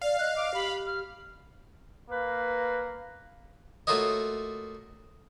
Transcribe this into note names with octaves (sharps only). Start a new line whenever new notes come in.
D5 F5
D#5 F#6
D6
G4 B5
F6
A#3 B4
A3 A#3 F4 F#4 C#5 D#5